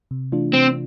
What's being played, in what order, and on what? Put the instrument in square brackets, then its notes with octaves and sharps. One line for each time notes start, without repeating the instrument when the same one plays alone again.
[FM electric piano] C3
E3 A3 D4 F4
[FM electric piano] C3 [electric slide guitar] C4